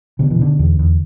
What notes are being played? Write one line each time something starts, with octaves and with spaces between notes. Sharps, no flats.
B2 D3
E3
B2 D3
E2
E2